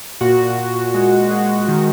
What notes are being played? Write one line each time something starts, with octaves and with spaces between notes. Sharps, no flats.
A#2 F#4
A#2
G#3
G#3
D#3